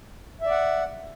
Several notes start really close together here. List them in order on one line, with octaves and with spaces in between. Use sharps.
E5 D5 F#5